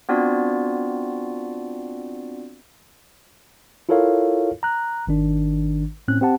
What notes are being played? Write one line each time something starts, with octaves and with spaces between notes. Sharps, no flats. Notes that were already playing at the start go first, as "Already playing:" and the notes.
B3 C4 D4 F4 F#4 D5
E4 F4 A4 A#4 C#5 F5
A#5 F#6
G#1 D#3 D4
A2 C4 C#4 F#6
C4 G4 F#5 A5